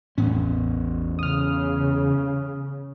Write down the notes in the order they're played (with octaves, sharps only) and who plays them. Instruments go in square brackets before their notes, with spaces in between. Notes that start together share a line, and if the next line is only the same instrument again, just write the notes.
[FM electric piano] A1 [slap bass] E2 B3 C#4
[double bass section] C#3 [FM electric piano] D#6 F6